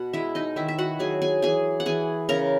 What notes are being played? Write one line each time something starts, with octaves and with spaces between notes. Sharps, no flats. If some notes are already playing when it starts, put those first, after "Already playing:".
Already playing: B2 F#5
G#3 E4 E5
D#4 D#5
D#3 E4 E5
E5
F#4 F#5
F#3 G#4 G#5
G#4 G#5
E3 G#4 G#5
F#5
E3 G#4 G#5
C#3 A#4 A#5